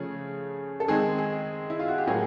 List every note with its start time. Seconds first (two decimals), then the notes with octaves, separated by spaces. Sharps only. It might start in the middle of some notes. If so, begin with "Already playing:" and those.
Already playing: C#3 F3 A3 C#4 G#4
0.80 A4
0.88 D#3 G#3 C4 G#4
1.18 G#4
1.70 E4
1.79 F4
1.88 F#4
1.98 G4
2.07 A2 F#3 A#3 G#4